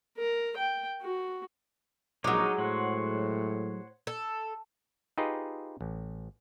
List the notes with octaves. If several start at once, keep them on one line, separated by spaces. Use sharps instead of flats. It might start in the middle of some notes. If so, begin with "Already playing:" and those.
A#4
G5
F#4
A#1 F#3 G#3 D#4 C#5 D6
A2 C5 C#5 F#5
A4
D#4 F4 G4 G#4 B4 D#5
A1